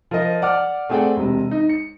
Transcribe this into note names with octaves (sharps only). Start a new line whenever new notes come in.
F3 A#4 D#5
D5 F#5 D6 F6
A3 C4 G#4 D5 F#5 G5
E1 C3
D#4
C#7